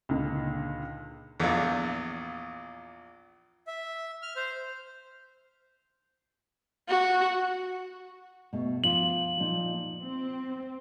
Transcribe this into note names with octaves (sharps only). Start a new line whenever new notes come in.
C#2 A#2 D3 D#4
A#1 E2
E5
F6
C5
F#4
B2 A3
F3 F4 F#7
A#2 F3 D#4
C4